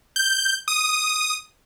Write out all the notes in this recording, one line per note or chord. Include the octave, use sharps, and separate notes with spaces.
G6
D#6